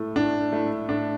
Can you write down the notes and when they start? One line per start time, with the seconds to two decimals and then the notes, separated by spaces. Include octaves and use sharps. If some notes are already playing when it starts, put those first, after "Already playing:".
Already playing: A2 A3 E4
0.16 A2 D4
0.52 A3 E4
0.89 A2 D4